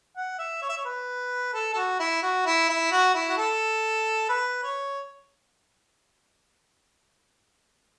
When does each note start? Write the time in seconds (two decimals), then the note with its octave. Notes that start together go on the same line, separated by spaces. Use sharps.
0.17 F#5
0.39 E5
0.62 C#5
0.69 E5
0.77 C#5
0.85 B4
1.54 A4
1.73 A4
1.76 F#4
2.00 E4
2.22 F#4
2.46 E4
2.68 E4
2.91 F#4
3.14 E4
3.29 F#4
3.37 A4
4.29 B4
4.64 C#5